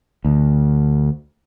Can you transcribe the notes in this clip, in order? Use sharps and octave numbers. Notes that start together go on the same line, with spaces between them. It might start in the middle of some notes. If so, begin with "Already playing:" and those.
D2